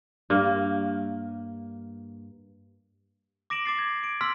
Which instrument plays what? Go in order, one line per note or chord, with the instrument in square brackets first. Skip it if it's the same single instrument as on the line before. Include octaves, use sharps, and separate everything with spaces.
[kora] G2 A#3
[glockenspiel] D6 A#6 D7 E7 F#7
D6 A6 C7
G#6
D7
C6 E6 F6 B6 F#7